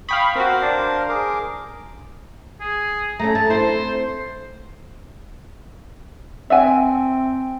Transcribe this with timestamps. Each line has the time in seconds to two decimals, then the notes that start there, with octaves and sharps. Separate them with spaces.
0.09 F5 G5 B5 C#6 D#6
0.36 C4 F#4 A#4 C5 F5
0.62 D4
1.09 G#4 A#4 D6
2.60 G#4
3.20 A3 C#4 A#5
3.35 A3 A5
3.50 C4 E4 C5
6.50 C4 E5 F#5 G#5